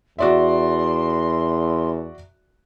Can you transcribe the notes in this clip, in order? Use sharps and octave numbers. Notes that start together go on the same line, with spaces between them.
E2 F#4 D5 E5 C6